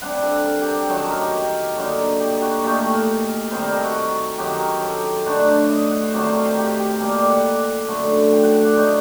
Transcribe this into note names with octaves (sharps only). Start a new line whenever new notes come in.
C3 G3 D4 F#5
A4
A#4
G4
A4
F#2 D#3 F#3 A4
A4
A#4
G4
D3 F#3 A#3 D#4
G4
F#4
A#2 A3 D#4 G4
A4
A#4
C3 D#3 G3 C5
A#4
A4
F#4
F#2 D#3 F#3 G4
A#4
A4
D3 F#3 A3 D4 C5
D#5
F#5
C5
C3 D#3 F#3 A3 D5
C5
A#4
G4
G4
G4
A#2 G3 A#3 A4
D5
F#5
F#2 D3 A3
G5
F#5
F#5
D5
A2 A3 D#4